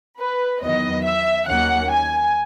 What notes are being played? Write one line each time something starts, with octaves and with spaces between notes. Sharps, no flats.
B4
E2 D#3 F#3 B3 D#5
E5
D#2 D#3 F#3 A#3 C#4 F#5
G#5